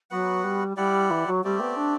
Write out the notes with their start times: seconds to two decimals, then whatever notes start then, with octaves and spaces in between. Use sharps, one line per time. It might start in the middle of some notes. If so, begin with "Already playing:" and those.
0.11 F#3 B3 F#4 B4 F#5
0.43 G3
0.77 G3 E4 G4 D5 F#5
1.10 E3
1.26 F#3
1.44 G3 A3 C4 G4 D5
1.59 B3
1.76 D4